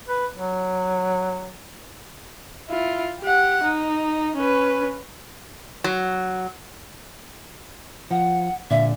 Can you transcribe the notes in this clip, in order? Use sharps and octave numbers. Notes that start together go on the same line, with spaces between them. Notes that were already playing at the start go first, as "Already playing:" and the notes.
B4
F#3
E4 F4
G4 F#5
D#4
C#4 B4
F#3
F3 F#5
A#2 D3 E5